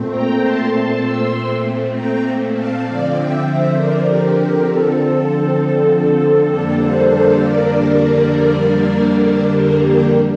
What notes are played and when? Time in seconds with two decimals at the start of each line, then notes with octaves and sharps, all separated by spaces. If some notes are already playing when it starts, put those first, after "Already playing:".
Already playing: A#2 A3 C4
0.10 G5 A#5
0.41 A5 C6
0.71 A5 C6
1.01 C6 E6
1.92 G5 A#5
2.52 F5 A5
2.83 D3 F3 C4 D5 F5
3.12 E5 G5
3.43 C5 E5
3.73 A#4 D5
4.04 G4 A#4
4.33 G4 A#4
4.64 A4
6.46 F2 D3 G3 A#3 D4 A4
6.76 A4 C5
7.06 A4 C5
7.36 A#4 D5
9.18 A#4 D5
9.48 G4 A#4
9.79 G4 A#4